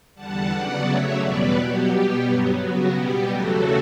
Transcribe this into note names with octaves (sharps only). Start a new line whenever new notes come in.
E2 D3 G3 F#5 A5
C#3 F#3 B3 D5 F#5
C#3 F#3 A3 C#5 E5
E2 B2 G3 B3 B4 D5
B2 F#3 B3 G4
B2 G3 B3
G2 F#3 B3
C#3 F#3 B3 F#4
B2 G3 B3 G4
E2 C#3 F#3 A3 F#4 A4